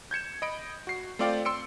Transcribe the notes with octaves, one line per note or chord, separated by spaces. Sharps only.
G6 G#6 C#7 E7
D#5 B5 D7
F#4 C7
A3 C4 F4 D5 F5 G5
C6 E6 C#7 D7